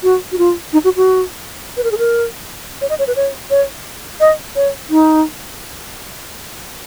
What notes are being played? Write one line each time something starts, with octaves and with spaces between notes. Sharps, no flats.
F#4
F#4
F4
D#4
F#4
F#4
B4
A#4
G#4
A#4
C#5
D#5
C#5
B4
C#5
C#5
D#5
C#5
D#4